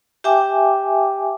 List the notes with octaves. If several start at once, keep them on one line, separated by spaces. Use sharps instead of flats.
G4 E5 G5 G#5 D6